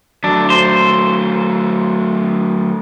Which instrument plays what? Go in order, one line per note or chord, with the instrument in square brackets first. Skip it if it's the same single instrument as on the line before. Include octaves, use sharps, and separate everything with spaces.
[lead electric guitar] F#3 A3 [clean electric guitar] D4
[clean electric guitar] C5